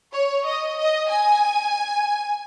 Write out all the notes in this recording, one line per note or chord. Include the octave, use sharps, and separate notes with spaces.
C#5
D#5
D#5
G#5